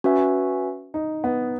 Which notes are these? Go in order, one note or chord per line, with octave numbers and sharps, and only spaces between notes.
C#4 F#4 B4 E5 G#5
D#4
B3